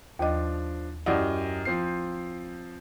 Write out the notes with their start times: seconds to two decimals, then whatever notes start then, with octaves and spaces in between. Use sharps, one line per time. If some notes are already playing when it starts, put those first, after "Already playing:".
0.19 D#2 F3 D4 D#5
1.06 F#2 E4 G4 D5 D#5 F#5
1.65 F3 C4 C7